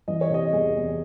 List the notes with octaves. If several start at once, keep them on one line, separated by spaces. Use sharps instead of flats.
E3 D#5
C#5
C3 D#5
E2 G#4
E2